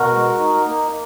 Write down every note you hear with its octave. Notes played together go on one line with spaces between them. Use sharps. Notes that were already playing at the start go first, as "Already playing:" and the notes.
Already playing: B2 F#4 A#4
G#3
D#4
A#3